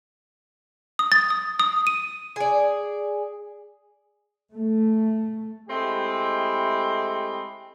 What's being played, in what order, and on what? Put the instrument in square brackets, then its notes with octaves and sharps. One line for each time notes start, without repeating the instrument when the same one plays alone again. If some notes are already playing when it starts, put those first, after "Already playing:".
[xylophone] D#6
A6
D#6
D#6
D#7
[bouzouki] G#4 D5
[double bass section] A3
[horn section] G#3 A3 C4 E4 G4